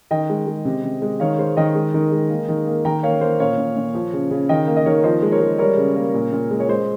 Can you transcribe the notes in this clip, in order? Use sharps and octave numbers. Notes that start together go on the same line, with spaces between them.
D#3 D#5 G5
G#3
G#3
C3
C3
G#3
D#3 C#5 F5
G#3 C5
D#3 D#5 G5
G#3
D#3
G#3
A#3
D#3
A#3
D#3 G5 A#5
A#3 C#5 F5
A#3 C5
A#2 C#5 F5
A#2
A#2
F3
C#3
C#3
D#3 D#5 G5
A#3
D#5
D#3 A#4 C#5
F3 C5 D#5
G#3
A#4 C#5
G#3
G3 A#4 C#5
C#3
A#3
A#2
A#2
G#3
C#5
G#3 C5